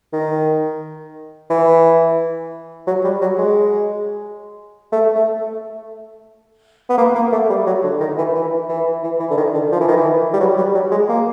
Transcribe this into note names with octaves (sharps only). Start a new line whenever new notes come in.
D#3
E3
F#3
G3
F#3
G#3
A3
A3
B3
A#3
A#3
A3
G3
F#3
D3
D#3
E3
E3
E3
E3
E3
D3
D#3
D3
F3
E3
D#3
E3
G3
F#3
G3
F#3
G#3
A#3